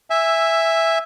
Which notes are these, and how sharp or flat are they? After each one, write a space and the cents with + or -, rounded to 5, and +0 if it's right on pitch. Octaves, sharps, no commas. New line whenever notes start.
E5 +0 G#5 -15 E6 +10